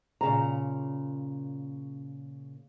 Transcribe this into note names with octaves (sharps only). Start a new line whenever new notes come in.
A#2 C#3 A#5